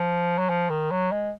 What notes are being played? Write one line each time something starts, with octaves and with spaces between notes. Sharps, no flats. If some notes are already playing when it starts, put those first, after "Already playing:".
Already playing: F3
F#3
F3
D#3
F#3
G#3